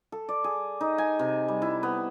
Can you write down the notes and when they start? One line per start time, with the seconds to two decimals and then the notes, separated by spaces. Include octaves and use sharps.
0.12 A4
0.29 D5
0.44 G#4
0.81 D#4
0.98 G#5
1.19 C3
1.48 G3
1.62 E4
1.83 B3